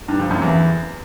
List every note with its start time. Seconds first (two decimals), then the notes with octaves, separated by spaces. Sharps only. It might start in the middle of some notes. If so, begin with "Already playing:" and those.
0.08 G2
0.20 F2
0.31 F#2
0.42 E2